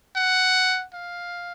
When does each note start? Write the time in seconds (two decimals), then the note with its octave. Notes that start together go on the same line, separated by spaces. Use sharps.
0.16 F#5
0.93 F5